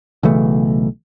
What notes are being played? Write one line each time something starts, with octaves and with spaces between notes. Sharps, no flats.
B1 C#3 E3 A3